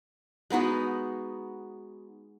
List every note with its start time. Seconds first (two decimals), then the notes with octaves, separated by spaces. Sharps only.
0.50 G#3 B3 D#4 F#4